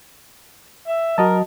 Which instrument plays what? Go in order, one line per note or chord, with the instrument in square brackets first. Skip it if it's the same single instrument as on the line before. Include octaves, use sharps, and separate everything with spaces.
[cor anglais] E5
[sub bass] F#3 [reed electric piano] F#4 D#5 A5 [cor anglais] A#4